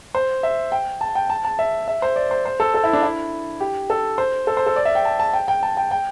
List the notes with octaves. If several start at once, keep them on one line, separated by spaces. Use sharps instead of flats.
C5
E5
G5
A5
G5
A5
A5
E5
E5
C5
D5
C5
C5
A4
A4
E4
D4
E4
G4
A4
C5
A4
C5
A4
D5
E5
G5
A5
A5
G5
G5
A5
G5
G5